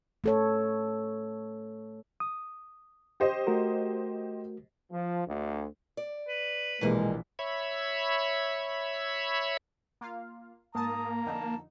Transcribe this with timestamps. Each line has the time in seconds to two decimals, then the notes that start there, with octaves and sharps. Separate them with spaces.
0.24 A3 A4 C#5
2.20 D#6
3.20 G4 C5 D#5
3.47 A3 F#4 A#4
4.92 F3
5.28 D2
5.97 D5
6.28 B4
6.81 A#1 B2 E3 G3 G#3 A#3 B6
7.39 C#5 E5 B5
10.01 A#3 F4 F5
10.75 G#2 A#3 A5 A#5 D#6
11.26 F2 D3 D#4 A5